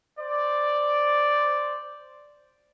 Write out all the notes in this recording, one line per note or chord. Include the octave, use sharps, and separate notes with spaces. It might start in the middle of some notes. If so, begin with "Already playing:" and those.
C5 D5